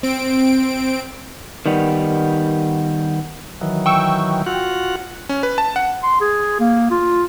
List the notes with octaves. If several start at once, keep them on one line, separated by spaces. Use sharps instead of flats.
C4 D7
D#3 G3 B3
D#3 E3 F#3
G5 C#6 E6
F4 F#4 F#5
C#4
B4
A5
F#5
C6
G#4
A#3
F4